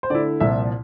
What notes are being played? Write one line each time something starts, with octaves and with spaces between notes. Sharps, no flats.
C5
D3 A3 E4 D5
C2 A#2 F3 E5